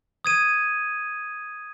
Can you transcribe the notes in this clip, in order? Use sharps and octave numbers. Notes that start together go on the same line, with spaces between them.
D#6 G#6 D#7